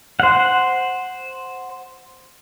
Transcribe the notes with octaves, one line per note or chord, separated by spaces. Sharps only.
C5 F#5